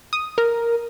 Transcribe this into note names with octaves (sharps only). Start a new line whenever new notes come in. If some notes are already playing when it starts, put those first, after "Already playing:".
D#6
A#4